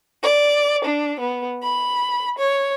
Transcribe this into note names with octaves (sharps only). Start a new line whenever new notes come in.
D5
D4
B3
B5
C#5